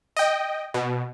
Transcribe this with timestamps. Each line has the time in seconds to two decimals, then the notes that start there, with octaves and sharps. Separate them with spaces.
0.17 D#5 G5
0.74 B2